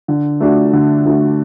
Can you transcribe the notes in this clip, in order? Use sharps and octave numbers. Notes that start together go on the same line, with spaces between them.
D3
A3 D4 F#4
D3
A3 D4 F#4